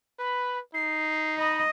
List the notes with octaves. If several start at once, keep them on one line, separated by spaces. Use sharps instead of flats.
B4 B5
D#4 C7
D#5 B5